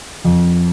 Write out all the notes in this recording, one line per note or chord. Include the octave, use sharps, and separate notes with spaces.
F2